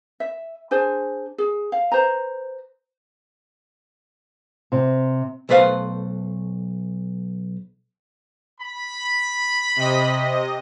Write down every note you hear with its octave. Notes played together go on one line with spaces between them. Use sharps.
E5
D4 G#4 C5 G#5
G#4
F5
B4 C5 A#5
C3
B1 A3 B4 C5 F5
B5
C3 D#5